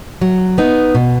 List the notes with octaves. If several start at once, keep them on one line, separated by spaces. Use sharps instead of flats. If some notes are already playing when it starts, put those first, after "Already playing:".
F#3
B3 D#4
B2